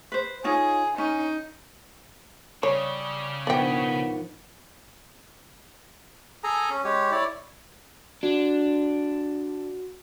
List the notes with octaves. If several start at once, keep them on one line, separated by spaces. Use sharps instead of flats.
B4 C5
D#4 F4 G#4 C#5
C#4 D#4 G#5
C#3 G3 C#5
A#1 G#2 B2 B3 D5 G5
G#4 A4 G#5 A#5
C#4
G#3 G4 C#5
E4 C#5 D5
D4 F#4